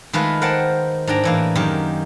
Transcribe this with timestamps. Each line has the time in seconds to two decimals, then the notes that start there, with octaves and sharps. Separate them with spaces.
0.13 D#3 G#3 A3 F4 B4
0.42 A#4 C5 F#5 G5 A5
1.07 G#2 D4 G5 A#5
1.24 A2 E3 A#3
1.55 F#2 D#3 G4